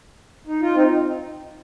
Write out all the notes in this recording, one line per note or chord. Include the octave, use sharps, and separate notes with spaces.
D#4
F4
C4 D#4